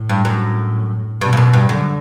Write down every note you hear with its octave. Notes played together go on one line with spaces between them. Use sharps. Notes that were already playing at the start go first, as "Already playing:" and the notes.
Already playing: A2
G2
F#2
G2 B2
G2
F#2
G2
F#2 D3